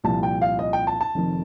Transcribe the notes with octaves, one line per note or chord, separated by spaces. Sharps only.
C2 A#2 F3 A5
G5
F5
D#5
G5
A5
A5
F1 F2 D#3